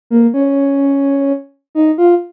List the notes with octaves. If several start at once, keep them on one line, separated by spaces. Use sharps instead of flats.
A#3
C#4
D#4
F4